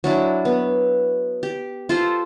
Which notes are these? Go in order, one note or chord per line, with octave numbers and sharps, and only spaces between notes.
F#3 D4 E4
B3
G4
F4 A4 C5